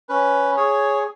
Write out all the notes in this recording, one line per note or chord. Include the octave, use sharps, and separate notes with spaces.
C#4 B4
G#4 C#5